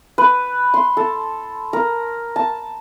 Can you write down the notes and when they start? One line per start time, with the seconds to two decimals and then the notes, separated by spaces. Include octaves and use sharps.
0.18 B4
0.74 C6
0.97 A4
1.73 A#4
2.36 A5